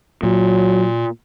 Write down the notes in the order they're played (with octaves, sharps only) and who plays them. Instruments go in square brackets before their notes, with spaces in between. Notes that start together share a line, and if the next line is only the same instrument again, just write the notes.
[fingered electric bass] A#2 [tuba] F#3